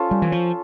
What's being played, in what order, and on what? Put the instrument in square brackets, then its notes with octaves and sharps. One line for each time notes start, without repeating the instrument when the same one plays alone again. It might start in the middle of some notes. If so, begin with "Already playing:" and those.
Already playing: [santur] C#4 F4 A4
[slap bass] G3
E3
F3